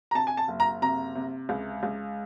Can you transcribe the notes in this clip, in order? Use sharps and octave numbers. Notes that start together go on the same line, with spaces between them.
A#5
C3 A5
G#5
A5
F#1
A#5
C3 A#5
C3
C#2
C#2